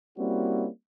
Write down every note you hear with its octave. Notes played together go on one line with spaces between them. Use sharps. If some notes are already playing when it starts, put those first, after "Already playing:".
G3 A#3 C4 C#4 E4 F#4